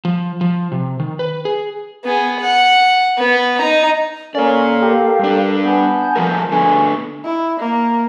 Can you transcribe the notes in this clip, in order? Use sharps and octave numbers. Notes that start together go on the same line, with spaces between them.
F3
F3
C3
D#3
B4
G#4
B3 G#4
F#5
B3
D#4 A#5
A#3 C#4 A4 A#4 D5 F5
G4
G2 D4
B3 G#5 A5 G6
F3 A3 A#4
D3 A3 B3 G#5 C#6
E4
A#3